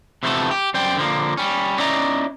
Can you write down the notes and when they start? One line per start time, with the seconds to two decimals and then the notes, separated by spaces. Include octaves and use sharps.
0.23 C3 E3 F3 A3 B3 A4
0.51 G4
0.74 F#2 C5 D5 G5
0.97 D3 F3 A#3
1.37 G3 C#4
1.79 C#4 E4 D5 D#5 A#5